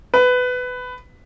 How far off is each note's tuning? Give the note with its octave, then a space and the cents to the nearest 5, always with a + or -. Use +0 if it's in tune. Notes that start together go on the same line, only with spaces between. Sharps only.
B4 +15